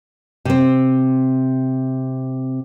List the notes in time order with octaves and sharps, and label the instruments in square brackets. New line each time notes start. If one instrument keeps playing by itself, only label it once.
[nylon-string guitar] C3 C4